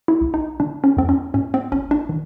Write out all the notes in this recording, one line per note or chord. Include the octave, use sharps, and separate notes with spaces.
E4
B1
D#4
D3 D4
C#4
F2 C4
C#4
G#2 C#4
C4
G#1 C#4
D4
D#3